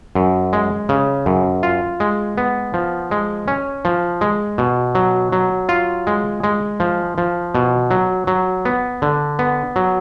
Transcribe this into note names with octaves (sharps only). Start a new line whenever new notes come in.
F#2
G#3
C#3
F#2
F4
G#3
B3
F3
G#3
C#4
F3
G#3
B2
F#3
F#3
F4
G#3
G#3
F3
F3
B2
F#3
F#3
B3
D3
B3
F#3